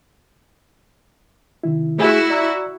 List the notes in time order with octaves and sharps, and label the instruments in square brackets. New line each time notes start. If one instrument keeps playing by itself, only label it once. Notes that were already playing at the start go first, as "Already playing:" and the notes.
[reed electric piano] C3 D#3 E4
[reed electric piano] A3 G#4 [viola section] E4 F#4
[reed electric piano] D5 A#5 E6